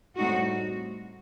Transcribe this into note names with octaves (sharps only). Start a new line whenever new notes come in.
A2 G3 C4 D#4 F#4